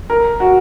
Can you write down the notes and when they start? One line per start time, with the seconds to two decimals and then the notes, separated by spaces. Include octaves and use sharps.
0.10 A#4
0.40 F#4